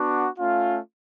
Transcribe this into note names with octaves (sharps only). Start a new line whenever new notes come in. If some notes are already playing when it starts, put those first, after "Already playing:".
Already playing: B3 D4 F#4
A3 C#4 F4